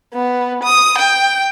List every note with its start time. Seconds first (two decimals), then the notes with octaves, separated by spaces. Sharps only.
0.13 B3
0.64 D#6
0.99 G5